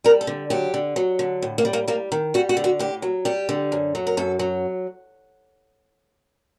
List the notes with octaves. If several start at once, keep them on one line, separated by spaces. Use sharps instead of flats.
G3 A#4
A4
D3
F#3 G4
D3
F#3
D3
A2
A#3
G3
A#3
G3 A#3
D#3
G3 F#4
F#4
D3
F#4
A2 G4
F#3
G3 G4
D3
F#2
F#3
A#4
F#2 A4
F#3